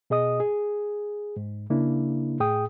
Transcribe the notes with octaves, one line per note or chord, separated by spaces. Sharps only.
B2 G#4 D#5 D#6
G#4
G#2
C#3 A#3 D4 E4
A2 G#4 G5 D#6